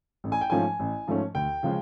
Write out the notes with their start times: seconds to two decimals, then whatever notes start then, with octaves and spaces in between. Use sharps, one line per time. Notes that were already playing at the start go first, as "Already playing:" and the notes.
0.24 A1
0.32 G#5
0.41 G5
0.50 G#2 F3 A3 C#4 G#5
0.79 A1
1.07 G#2 F3 A3 C#4
1.35 D2 G5
1.63 C#3 F3 G#3